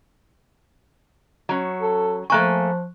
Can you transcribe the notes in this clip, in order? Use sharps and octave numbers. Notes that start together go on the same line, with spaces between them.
F#3 C#4
A4
F3 A3 A#3 G#5 C#6 F#6